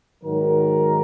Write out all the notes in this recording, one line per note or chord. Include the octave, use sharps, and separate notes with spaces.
G#2 D#3 F#3 A#4